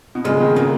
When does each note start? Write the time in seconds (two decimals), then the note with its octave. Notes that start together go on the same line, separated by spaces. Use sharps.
0.15 B2
0.25 A#2 C#3 G#3
0.40 B2 D#3
0.56 A#2 C#3 A#3